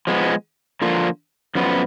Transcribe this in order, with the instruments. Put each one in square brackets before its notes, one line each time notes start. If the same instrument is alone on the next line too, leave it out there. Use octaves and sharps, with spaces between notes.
[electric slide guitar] F3 G#3 B3
D3 F3 A#3 F4
F#2 F3 B3